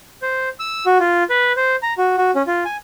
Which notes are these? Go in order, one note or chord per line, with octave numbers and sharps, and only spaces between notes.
C5
E6
F#4
F4
B4
C5
A#5
F#4
F#4
C#4
F4
G#5